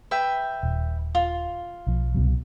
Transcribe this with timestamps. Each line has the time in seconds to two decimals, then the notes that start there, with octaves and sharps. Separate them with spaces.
0.11 B4 E5 G5
0.63 D#1
1.15 F4
1.87 B1 F3
2.14 C2 B2 F#3